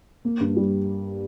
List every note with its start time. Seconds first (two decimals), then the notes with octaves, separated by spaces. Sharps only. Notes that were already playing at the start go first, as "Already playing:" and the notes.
0.25 A#3
0.40 G2
0.57 G3